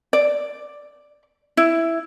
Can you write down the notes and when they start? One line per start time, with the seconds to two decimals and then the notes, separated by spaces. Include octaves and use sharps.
0.13 D5
1.57 E4